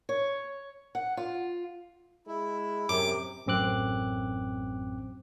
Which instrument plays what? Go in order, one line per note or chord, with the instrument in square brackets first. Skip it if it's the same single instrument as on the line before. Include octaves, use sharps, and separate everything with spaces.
[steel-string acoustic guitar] C#5
F#5
F4
[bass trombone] G#3 [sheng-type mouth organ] E4
[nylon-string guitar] F#2 [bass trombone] C3 [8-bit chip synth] D6
[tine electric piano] A1 F#2 C4 D6 F#6